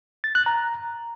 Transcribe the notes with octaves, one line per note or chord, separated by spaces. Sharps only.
A6
F#6
A#5